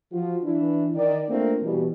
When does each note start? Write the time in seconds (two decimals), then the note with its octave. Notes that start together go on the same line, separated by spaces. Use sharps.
0.12 F3 F4 F#4
0.44 E3 D4 E4
0.95 D#3 D5
1.28 A3 A#3 C4 D4 F4 A#4
1.62 B2 E3 G3